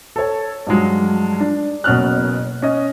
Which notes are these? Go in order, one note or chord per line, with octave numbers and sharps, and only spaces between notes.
A4 C#5
G2 F3 F#3 G#3
D4
F#1 B2 C#4 F6 F#6
C#4 D#5